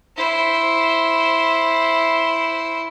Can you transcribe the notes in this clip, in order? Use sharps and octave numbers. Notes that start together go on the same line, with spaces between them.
E4 C5